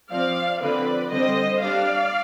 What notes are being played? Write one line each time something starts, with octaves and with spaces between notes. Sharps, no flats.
F3 C4 D5 F5
D3 F3 C4 B4 D5
D3 G3 C4 C5 D#5
G3 D4 D5 F5